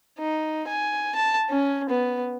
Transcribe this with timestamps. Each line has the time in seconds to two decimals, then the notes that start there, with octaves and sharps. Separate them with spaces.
0.19 D#4
0.68 G#5
1.15 A5
1.49 C#4
1.89 B3